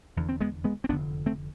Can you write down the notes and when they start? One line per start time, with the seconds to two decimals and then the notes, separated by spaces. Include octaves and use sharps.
0.16 F1 E2 D3
0.29 C4
0.41 G#3 B3
0.64 G#3 B3
0.84 C4
0.89 F1 E2 D3 B3 D4
1.26 A3 C4